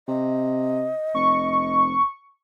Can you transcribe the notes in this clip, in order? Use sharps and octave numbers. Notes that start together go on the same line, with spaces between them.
C3 D#5
F1 C#6